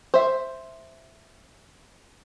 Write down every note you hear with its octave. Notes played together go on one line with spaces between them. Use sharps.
C5 E5